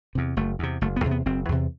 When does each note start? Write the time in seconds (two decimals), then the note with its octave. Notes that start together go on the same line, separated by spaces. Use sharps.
0.15 E2 C3
0.37 F#1 A3
0.59 E2 C3
0.81 F#1 A3
0.96 B3
1.04 E2 C3
1.11 B3
1.26 F#1 C4
1.49 E2 C3